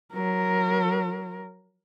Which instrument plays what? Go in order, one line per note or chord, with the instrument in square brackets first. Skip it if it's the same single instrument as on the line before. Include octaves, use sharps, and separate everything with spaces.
[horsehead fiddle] F#3 A#4